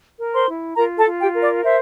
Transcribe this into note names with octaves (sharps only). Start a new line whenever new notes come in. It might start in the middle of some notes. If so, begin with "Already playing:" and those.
A#4
C5 C6
E4
F4 A#4 A#5
A4 A5
F4
G4 G5
A#4
D5
C5 E5